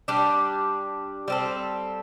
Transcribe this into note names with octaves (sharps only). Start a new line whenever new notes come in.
G3 D4 G4
G3 C4 A4